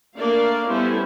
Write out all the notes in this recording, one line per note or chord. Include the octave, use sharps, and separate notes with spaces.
A3 A#3 D4 D5 F5
G3 A3 B3 C#4 E4 C5